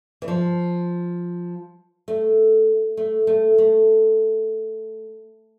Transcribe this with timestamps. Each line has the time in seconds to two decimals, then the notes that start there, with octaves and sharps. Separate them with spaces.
0.22 E3
0.28 F3
2.08 A3
2.97 A3
3.27 A3
3.58 A3